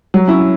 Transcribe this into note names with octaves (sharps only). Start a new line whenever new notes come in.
F#3
C#4 E4